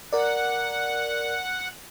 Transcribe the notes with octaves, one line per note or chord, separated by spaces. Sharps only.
A#4 D5 F#5